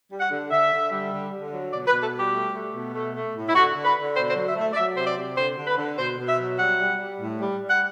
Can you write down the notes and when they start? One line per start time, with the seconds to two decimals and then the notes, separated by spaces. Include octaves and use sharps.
0.10 G3
0.20 F#5
0.30 D3
0.50 D3 E5
0.71 D3
0.91 G3
1.11 D3
1.32 D3
1.52 F#3
1.72 B2 D5
1.87 B4
1.92 B2
2.02 A4
2.12 G3
2.18 G4
2.33 A3
2.53 A3
2.73 B2
2.93 A3
3.14 A3
3.34 A2
3.48 E4
3.54 D3 F#4
3.75 D3
3.85 B4
3.95 D3
4.15 B2 C5
4.30 C5
4.35 F#3
4.46 E5
4.55 A3
4.61 E5
4.72 D5
4.76 F#3 E5
4.95 C3 C5
5.06 D5
5.16 C3
5.36 D3 C5
5.57 D3
5.67 B4
5.77 D3
5.97 B2 C5
6.17 B2
6.27 E5
6.38 F#3
6.58 G3 F#5
6.78 G3
6.99 G3
7.19 A2
7.39 G3
7.59 G3
7.69 F#5